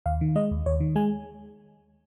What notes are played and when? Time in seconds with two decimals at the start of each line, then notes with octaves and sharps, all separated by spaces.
0.06 D#2 F5
0.21 D#3
0.35 G#3 D#5
0.51 D#2
0.66 D#2 C#5
0.80 D#3
0.96 G#3 G#5